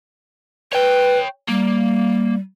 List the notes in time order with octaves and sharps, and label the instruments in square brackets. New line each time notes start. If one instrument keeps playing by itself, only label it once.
[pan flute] B4 [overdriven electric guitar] C#5 G5
[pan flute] G3 [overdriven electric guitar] A#3